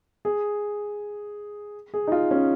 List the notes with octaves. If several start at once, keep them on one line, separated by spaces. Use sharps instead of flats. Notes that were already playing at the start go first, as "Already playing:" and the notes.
G#4
G#4
D#4
F4
C#4